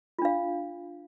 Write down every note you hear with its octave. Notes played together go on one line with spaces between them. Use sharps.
D4 F4 F5